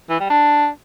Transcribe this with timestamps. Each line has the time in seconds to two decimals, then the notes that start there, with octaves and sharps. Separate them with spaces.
0.10 E3
0.20 G3
0.30 D4